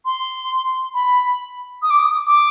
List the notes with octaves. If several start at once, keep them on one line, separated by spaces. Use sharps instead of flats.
C6
B5
D#6
D6
D#6
D6